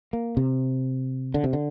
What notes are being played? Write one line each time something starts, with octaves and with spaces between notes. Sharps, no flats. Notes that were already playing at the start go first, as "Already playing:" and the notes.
A#3
C3
D3
C3
D3